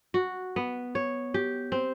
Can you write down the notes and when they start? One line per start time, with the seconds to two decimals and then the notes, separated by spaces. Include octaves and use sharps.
0.14 F#4
0.56 B3
0.95 C#5
1.34 G4
1.72 C4